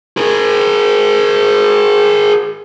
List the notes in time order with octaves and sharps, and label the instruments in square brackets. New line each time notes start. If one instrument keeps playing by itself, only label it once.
[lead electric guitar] G#4 A#4